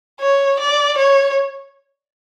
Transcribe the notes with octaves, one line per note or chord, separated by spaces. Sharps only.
C#5
D5
C#5